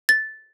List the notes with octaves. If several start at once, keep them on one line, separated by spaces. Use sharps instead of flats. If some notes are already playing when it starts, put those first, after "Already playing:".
A6